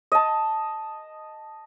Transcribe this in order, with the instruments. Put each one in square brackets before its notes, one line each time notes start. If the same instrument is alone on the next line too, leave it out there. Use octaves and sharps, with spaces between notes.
[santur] D#5 A5